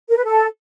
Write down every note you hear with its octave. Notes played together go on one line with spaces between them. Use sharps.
A#4
B4
A4